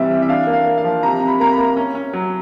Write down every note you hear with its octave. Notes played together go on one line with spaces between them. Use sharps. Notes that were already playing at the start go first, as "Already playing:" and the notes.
Already playing: C3 E3 G3 E5
E3
E5
D4 F5
A#3
F5
A#3
F5
F3
C3 A#5
C3
B5
A#3 A#5
B5
A#3
C#4
C#4
F#3